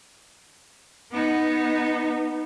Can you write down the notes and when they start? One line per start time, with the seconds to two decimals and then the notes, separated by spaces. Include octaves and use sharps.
1.12 B3 D#4